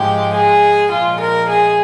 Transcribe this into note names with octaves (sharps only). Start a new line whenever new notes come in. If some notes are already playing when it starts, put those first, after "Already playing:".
Already playing: G#2 F3 G#3 G4
G#4
A#2 F3 G#3 F4
A#4
G#4